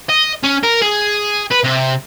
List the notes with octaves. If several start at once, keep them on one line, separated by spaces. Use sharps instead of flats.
D#5
C#4
A#4
G#4
B4
C3